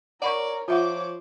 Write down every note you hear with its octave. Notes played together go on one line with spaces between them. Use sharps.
A#4 C#5 D5 F#5 B5 C#6
F3 F4 C#5 E5 F#5 D6